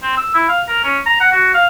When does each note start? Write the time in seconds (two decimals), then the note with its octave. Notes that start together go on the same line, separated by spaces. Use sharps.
0.03 C4
0.17 E6
0.35 E4
0.49 F5
0.68 A#4
0.84 C#4
1.06 A#5
1.21 F#5
1.32 F#4
1.54 F5